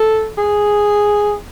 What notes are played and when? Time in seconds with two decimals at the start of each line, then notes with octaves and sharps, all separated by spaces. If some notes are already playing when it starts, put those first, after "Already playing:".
Already playing: A4
0.38 G#4